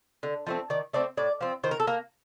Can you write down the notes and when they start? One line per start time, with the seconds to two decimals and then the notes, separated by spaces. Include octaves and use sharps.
0.23 D3
0.47 F3 A3 C4
0.70 D#3 D5
0.93 A3 C4 D5
1.17 A2 D5
1.41 F3 C4
1.64 D#3 C5
1.71 A#4
1.80 A4
1.87 A#3 A#4